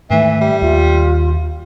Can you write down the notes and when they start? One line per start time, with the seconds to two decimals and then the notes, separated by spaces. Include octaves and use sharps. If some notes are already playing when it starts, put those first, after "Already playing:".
0.10 G#2 D#3 E3 A3 E5
0.41 G3 E5
0.62 D#2 F4